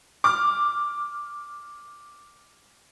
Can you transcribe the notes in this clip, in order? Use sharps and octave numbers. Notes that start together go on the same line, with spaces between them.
D6 F6